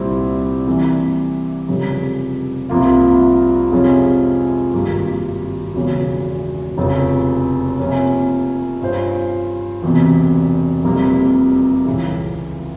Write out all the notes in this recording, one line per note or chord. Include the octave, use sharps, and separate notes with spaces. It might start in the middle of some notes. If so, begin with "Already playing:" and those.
Already playing: C2 A#2 G3 C4 E4
C3 E3 G3 A#3
F1 F2 C#3 G3
C2 C3 F3 A#3 F4
F2 C3 F3 G#3 C#4
G#1 G2 G3 A#3
E1 E2 C#3
F1 F2 C#3
C3 F3 A#3 C#4
G2 G3 C#4 F4 C5
E1 E2 C3
F1 F2 C3 G3 A#3
C#2 C#3 E3